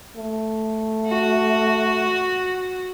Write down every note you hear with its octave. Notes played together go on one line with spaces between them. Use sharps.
A3
F#4